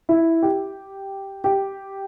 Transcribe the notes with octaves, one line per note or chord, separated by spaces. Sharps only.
E4
G4
G4